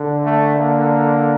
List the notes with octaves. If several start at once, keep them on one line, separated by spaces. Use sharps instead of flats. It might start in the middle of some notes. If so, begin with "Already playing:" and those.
Already playing: D3
A3
A#3